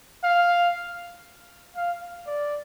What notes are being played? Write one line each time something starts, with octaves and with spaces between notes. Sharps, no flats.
F5
F5
D5